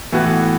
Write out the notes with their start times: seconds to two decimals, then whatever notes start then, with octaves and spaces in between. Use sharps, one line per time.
0.12 A2 E3 B3 F#4